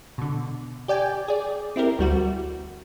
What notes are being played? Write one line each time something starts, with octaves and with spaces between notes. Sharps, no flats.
B2 D3
G4 D5 G5 G#5
G#4 D5
C4 E4 G4 A#4
D2 G3 F#4